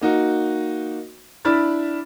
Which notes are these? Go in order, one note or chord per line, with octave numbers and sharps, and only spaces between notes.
A#3 D#4 F#4
D4 E4 B5 F6 A6